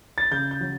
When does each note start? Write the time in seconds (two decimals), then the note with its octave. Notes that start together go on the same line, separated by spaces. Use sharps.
0.18 A6
0.31 C#3 G6
0.51 G6
0.61 F#3